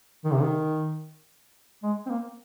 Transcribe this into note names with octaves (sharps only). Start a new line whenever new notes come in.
D#3
C3
D#3
G#3
C4
A#3